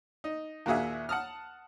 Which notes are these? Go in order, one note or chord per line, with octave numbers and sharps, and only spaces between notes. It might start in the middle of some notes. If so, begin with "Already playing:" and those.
D#4
D#2 A#2 F#4 G#4 E5
F#5 A5 D#6 F6